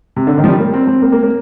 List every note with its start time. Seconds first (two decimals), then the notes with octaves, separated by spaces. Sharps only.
0.16 C3
0.27 D3
0.38 D#3
0.44 F3
0.48 G3
0.59 A#3
0.74 C4
0.87 C4
1.02 A#3
1.12 A#3
1.23 A#3